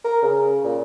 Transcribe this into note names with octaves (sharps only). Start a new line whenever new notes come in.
A#4
C#3
A#2